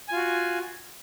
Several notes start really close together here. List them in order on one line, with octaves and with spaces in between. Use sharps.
G#5 F4 F#4